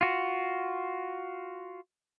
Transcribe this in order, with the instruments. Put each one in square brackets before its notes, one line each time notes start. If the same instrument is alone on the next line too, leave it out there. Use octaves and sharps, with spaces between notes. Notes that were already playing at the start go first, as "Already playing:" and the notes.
[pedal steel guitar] F4 F#4